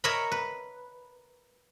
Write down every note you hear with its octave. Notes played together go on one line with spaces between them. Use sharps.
A#4 C#5 D#5 E5 A#5 B5
B4